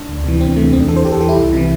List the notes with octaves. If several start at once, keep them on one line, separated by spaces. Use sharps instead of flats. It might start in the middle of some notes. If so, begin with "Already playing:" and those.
Already playing: D4
D2
C3 E3
D2 C4
C3 E3 A3
E2 C4
D4
E3 A4
C5
E2 G4
A4
E3 G4
E4
C2
C3 E3